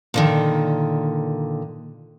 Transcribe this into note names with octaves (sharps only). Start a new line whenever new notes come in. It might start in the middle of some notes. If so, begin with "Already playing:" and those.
A#2 D3 D#3